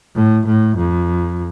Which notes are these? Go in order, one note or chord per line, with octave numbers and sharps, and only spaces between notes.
A2
A2
F2